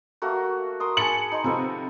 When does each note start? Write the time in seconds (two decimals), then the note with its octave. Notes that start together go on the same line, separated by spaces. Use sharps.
0.22 A3 A#3 F#4
0.80 A#4 C6 D#6
0.97 G#4 A5 B5 C#7 F#7
1.31 D#4 D#5 C6
1.44 C3 F3 A4 B4